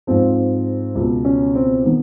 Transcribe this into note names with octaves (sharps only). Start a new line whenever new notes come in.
G#2 F3 C4
C#2 B2
C#4
C4
D#3 B3